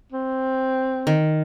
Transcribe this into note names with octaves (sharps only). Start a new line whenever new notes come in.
C4
D#3